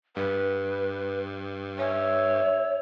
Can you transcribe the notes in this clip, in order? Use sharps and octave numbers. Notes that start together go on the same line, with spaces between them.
G2 B4
C#5 E5